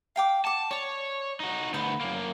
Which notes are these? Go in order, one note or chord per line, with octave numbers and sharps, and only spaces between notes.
F5 G5 D6
F#5 A5 D6
C#5 D5 C#6
D#4 F#4
D2 B3 C5 B5
F#2 A#3